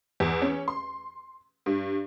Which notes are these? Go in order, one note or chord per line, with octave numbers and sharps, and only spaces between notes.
E2
C#4
C6
G2